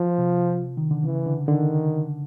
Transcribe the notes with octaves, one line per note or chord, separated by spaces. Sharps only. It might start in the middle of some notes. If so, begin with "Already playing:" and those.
Already playing: F3
C3
D#3
D3
C#3 E3
D3
D3 D#3